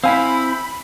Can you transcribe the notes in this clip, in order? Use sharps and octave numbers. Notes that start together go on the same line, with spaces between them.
C4 E4 F5 G#5 B5